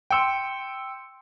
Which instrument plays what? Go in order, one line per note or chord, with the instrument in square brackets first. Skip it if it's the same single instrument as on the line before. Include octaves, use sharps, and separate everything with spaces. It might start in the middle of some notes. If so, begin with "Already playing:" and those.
[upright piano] G5 E6 [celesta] C6 C#7 D7